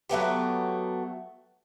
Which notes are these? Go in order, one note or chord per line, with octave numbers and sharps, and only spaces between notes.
F#3 A3 B3 G4